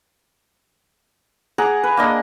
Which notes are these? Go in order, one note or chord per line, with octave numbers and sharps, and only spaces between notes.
G#4 F#5 A#5 D6
B4
A#3 D4 D#5